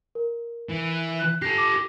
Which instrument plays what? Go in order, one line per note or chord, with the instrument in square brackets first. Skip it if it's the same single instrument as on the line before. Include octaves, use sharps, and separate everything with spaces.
[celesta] A#4
[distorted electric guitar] E3
[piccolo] F#6
[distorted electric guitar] G4 A4 [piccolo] A#6 [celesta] C7
[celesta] D6